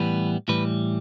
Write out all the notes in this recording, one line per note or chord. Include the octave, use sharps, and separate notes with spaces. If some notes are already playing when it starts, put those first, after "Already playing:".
Already playing: A2 E3 G3 B3 B4
A2 E3 G3 B4